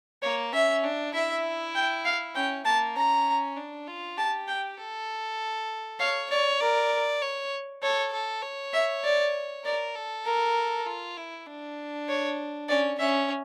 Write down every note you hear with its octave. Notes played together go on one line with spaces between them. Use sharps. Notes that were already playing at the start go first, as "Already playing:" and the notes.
A#3 C#5
C#4 E5
D4
E4 E5
G5
F5
C#4 G5
A#3 A5
C#4 A#5
D4
F4
G4 A5
G5
A4
C#5 F5
C#5 D5
A#4 D5
C#5
A4 C#5
A4
C#5
E5
D5
A#4 D5
A4
A#4
F4
E4
D4
C#5
C#4 D5
C#4 E5